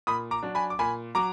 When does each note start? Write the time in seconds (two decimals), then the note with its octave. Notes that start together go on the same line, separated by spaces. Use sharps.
0.07 A#2 B5 D#6
0.31 A#5 D6
0.43 F#3 D4
0.55 G#5 B5
0.70 D6
0.79 A#2 G#5 B5
1.15 F#3 A#5 D6